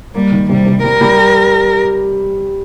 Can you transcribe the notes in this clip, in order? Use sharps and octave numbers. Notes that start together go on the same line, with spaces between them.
G3 A#3
D#3
C3 G3
C3
G3 A#4
G3
G4